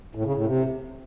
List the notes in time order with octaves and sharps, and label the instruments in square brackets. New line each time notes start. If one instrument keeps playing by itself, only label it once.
[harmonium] A2
C#3
A2
C3